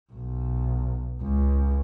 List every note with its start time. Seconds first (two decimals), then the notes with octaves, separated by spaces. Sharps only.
0.12 B1
1.21 C#2